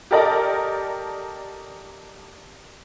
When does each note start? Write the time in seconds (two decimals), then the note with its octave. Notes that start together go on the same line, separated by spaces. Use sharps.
0.11 G4 A4 A#4 D5 D#5